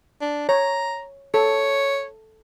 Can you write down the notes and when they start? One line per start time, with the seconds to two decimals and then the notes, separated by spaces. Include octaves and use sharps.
0.21 D4
0.49 C#5 A#5
1.34 A4 C#5